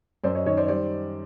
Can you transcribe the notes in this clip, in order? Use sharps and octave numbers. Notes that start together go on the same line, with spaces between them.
F#2 C5 D5
C#5 D#5
D#3 C#5 D#5
C5 D5
G3 C5 D5